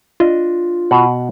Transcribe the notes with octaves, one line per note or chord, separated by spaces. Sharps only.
D4 F4 D#5
B2 F#5